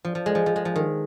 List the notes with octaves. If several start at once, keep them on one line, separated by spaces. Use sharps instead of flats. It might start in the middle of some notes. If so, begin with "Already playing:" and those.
F3
F3
G#3
F3
F3
G#3
F3
D#3